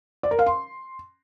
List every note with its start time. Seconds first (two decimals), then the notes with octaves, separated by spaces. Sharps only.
0.23 D5
0.31 A#4
0.39 F5
0.46 C6